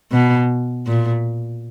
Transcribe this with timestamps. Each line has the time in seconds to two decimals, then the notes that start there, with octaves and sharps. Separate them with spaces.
0.12 B2
0.86 A#2